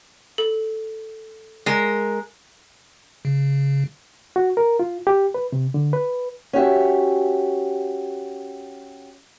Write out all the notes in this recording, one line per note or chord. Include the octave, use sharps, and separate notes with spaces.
A4
G#3 A#4
C#3
F#4
A#4
F4
G4
B4
C3
D3
B4
C#4 F#4 G4 E5